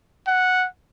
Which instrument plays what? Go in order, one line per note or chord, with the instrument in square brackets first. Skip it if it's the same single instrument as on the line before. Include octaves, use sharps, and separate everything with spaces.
[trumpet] F#5